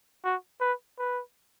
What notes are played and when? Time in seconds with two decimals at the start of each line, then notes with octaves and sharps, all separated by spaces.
0.24 F#4
0.61 B4
0.99 B4